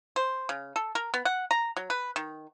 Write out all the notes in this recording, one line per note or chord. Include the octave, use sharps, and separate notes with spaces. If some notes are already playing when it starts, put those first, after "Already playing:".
C5
C#3
A4
A#4
B3
F#5
A#5
F#3
B4
D#3